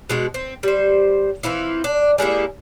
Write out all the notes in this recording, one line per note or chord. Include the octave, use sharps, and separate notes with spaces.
B2 G#3 F#4
C4
G3 C5
E3 C4 E4 F4
D4
G3 G#3 A#3 E4